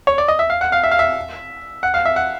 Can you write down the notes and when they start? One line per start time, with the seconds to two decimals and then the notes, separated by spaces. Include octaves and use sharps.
0.07 C#5
0.18 D5
0.28 D#5
0.39 E5
0.50 F5
0.61 F#5
0.72 F5
0.84 E5
0.91 F5
0.99 E5
1.83 F#5
1.94 F5
2.05 E5
2.16 F#5